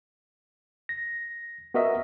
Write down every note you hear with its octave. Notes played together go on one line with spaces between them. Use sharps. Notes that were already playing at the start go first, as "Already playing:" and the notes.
A#6
B3 F#4 A#4 D#5 E5